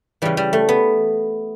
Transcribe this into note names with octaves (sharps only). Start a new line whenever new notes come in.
C#3 E3 G3
G3
A3
B3